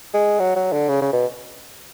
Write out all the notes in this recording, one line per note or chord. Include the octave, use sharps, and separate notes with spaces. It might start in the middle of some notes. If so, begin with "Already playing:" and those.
G#3
F#3
F#3
D3
C#3
C#3
B2